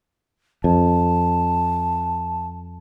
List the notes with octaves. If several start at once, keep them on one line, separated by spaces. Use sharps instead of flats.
F2 A5